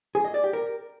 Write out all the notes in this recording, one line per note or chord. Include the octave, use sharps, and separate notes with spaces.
G#4
D#5
D5
G4
A#4